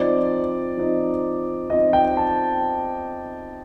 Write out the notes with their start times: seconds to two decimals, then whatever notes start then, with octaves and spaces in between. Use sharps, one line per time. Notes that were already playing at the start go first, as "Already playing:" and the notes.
Already playing: F3 C4 D#4 D5
0.77 F3 C4 D#4
1.70 F3 C4 D#4 D#5
1.93 G5
2.17 A5